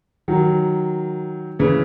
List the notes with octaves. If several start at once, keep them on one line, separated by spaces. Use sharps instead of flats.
D#3 F#3
C#3 E3